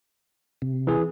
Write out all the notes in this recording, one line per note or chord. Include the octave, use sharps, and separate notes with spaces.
C3
E3 G#4